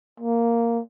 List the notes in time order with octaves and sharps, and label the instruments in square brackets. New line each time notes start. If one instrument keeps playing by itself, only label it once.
[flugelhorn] A#3